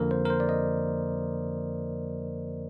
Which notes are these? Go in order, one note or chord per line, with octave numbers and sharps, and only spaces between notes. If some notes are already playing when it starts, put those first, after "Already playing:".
Already playing: F2 D3 F3 A#3 A#4
C5
A#4
C5
D5
D#5